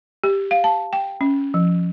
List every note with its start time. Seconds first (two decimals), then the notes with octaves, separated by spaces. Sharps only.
0.24 G4
0.51 F5
0.64 A5
0.93 G5
1.21 C#4
1.54 F3